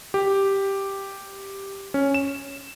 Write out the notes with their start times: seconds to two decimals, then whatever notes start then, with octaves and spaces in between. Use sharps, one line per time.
0.14 G4
1.94 C#4
2.14 E7